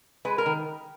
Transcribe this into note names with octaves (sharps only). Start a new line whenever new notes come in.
G#3 B4
A#4
D#3